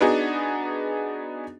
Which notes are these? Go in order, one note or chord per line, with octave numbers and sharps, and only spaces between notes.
B3 D4 D#4 F#4 G#4